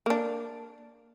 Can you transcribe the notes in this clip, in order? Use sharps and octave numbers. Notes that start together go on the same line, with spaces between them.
A#3 D4